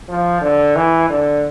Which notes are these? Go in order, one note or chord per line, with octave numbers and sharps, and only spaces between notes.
F3
D3
E3
D3